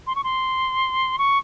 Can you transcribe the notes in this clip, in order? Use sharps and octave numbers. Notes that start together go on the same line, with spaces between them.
C6
C#6
C6
C#6